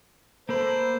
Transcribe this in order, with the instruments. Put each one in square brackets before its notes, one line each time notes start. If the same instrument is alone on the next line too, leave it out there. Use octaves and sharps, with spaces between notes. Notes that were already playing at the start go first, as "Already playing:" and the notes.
[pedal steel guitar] A#3 A4 B5 [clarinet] C5